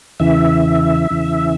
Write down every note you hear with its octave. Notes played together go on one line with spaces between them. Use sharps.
E2 C#3 E3 E5
E2 C#3 E3